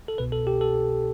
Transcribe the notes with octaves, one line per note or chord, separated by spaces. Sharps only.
A4
C2 B2 B3 B4
A4
G4
A4